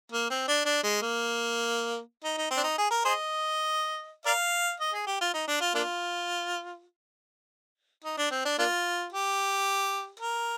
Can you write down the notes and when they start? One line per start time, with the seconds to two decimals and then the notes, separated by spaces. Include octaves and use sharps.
0.12 A#3
0.30 C4
0.48 D4
0.65 D4
0.83 G#3
1.02 A#3
2.24 D#4
2.37 D#4
2.51 C4
2.57 D4
2.64 D#4
2.78 G#4
2.90 A#4
3.05 G#4 C5 D#5
4.25 A#4 D5 F5
4.80 D#5
4.93 G#4
5.07 G4
5.21 F4
5.34 D#4
5.47 D4
5.60 F4
5.75 A#3 D4 F4
8.04 D#4
8.18 D4
8.31 C4
8.45 D4
8.59 A#3 D4 F4
9.12 G4
10.20 A#4